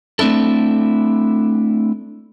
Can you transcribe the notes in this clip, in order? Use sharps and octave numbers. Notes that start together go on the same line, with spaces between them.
A3 C4 D4 E4 A4